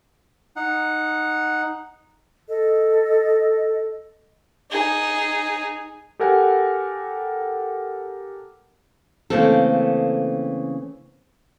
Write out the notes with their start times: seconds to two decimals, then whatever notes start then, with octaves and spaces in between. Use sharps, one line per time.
0.56 D#4 F#5
2.50 A4 D#5
4.70 D#4 G#4
6.20 G4 A4 A#4 F#5 G#5
9.30 C#3 E3 A3 A#3 C4 A4